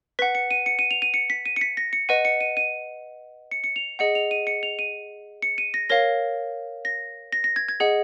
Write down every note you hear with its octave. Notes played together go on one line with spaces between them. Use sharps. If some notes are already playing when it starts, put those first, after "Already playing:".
B4 F#5 B6
C#7
D#7
C#7
D#7
F7
D#7
C#7
B6
D#7
C#7
B6
A#6
C#7
B4 D#5 F#5 D#7
C#7
D#7
D#7
C#7
C#7
F7
G#4 D#5 F#5 C#7
F7
D#7
C#7
F7
D#7
C#7
D#7
A#6
A#4 C#5 F5 A#6
A#6
A#6
A#6
G#6
G#6
G#4 D#5 F#5